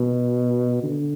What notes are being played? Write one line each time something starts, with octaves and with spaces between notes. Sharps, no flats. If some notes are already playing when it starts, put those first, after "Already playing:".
Already playing: B2
D3